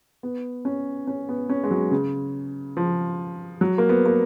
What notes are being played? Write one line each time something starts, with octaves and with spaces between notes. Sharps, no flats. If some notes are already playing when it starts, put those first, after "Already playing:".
B3
C#4
C#4
B3
C#4
G#3
F#3
C#3
F3
F#3
A#3
B3
A#3